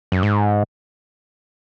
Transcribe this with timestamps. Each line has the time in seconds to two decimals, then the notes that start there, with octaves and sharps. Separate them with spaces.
0.12 F#2
0.23 G#2